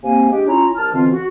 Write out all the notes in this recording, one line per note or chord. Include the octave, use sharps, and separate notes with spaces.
C3 A#3 C4 F5 G#5
G#3 D4 G4
C#4 E4 F4 A#5
C2 A5 F6
B2 D3 E3 C4 F4
F#4